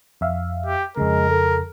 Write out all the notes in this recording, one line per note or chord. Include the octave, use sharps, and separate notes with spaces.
F2 E5 F5
G4
F2 C#3 G#3 A#4
A4